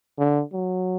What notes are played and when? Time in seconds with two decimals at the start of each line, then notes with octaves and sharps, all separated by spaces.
0.18 D3
0.53 F#3